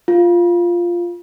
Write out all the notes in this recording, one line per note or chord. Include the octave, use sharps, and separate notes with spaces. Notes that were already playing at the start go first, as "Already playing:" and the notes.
F4